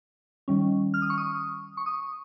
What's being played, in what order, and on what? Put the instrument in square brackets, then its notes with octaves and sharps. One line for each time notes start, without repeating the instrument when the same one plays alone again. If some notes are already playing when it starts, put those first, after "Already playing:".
[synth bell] D#3 G3 C#4
F6
D#6
C#6
D#6
C#6
D#6